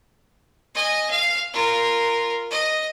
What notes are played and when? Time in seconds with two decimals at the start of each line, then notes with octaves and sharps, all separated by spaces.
0.75 D#5 G#5
1.11 F5
1.54 F4 A#4
2.51 D#5